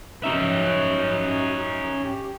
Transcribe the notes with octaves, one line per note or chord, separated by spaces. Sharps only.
F#2 C#4 D#4 E5
G4